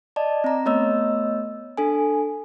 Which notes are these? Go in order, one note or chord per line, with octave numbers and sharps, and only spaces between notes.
D5 D#5 A5
C4 A#5
A3 B3 C#5 D#5 E6
D4 A4 G#5